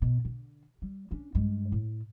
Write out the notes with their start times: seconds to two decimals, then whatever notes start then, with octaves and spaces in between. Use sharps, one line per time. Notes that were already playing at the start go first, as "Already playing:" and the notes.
0.02 B2
0.25 D3
0.82 G3
1.11 C#4 D4
1.35 G2 G#3
1.72 A2